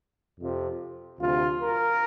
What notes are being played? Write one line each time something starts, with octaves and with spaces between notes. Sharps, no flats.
F2 C3 F3
D2 C3 F3 F4
A#4